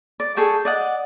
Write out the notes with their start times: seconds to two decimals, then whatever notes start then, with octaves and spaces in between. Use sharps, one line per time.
0.20 D5
0.37 G#4 A4 G5 C#6
0.65 D5 D#5 F#5